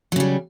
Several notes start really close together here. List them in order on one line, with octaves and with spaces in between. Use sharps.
F#3 C#3 G3